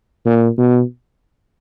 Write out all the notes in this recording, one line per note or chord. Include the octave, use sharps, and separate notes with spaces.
A#2
B2